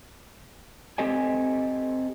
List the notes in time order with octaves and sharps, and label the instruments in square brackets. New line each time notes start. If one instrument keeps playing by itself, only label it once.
[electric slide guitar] C4 G4 A4 D#5 G#5